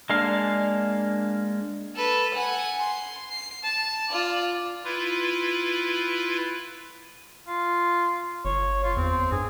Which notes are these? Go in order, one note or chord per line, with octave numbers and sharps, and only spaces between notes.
G#3 A#3 D4 F5
A4 B4
F#5 G#5
C6
C7
A5
F4 D5
E4 F4 B4
F4
G1 C#5
F4
E2 C4
G2 G#4